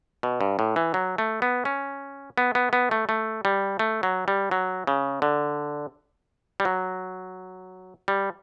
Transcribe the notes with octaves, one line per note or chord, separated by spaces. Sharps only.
B2
G2
A2
E3
F#3
A3
B3
C#4
B3
B3
B3
A3
A3
G3
A3
F#3
G3
F#3
C#3
D3
G3
F#3
G3